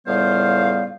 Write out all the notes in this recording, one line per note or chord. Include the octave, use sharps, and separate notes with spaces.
C#2 A2 G3 B3 C5 F5